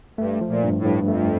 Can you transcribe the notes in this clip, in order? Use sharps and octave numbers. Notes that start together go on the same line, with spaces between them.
G2 A3
F3
A#2
G2
A2
G2
F2 A3